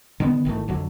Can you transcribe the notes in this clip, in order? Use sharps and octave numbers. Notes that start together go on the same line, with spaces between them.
D3 D#3 G3 B3
G#1 D#3 E3 A3
F2 D3 F#3